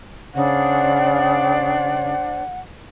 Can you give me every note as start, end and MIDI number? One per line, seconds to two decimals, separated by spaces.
0.35 2.15 49
0.35 2.42 62
0.35 2.42 72
0.35 2.42 74
0.35 2.59 78